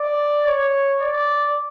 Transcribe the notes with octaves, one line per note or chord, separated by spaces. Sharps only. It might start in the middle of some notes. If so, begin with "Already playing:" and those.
Already playing: D5
C#5
D5